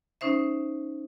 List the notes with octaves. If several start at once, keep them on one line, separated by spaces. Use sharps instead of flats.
C#4 D#4 C5 E5